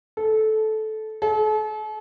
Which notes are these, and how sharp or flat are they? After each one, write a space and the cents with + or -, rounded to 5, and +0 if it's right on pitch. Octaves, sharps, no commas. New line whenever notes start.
A4 -15
A4 -40